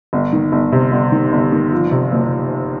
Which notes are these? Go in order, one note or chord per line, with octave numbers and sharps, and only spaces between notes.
G1
D#3
G1
C3
G1
D#3
G1
D#3
F3
C3
F#1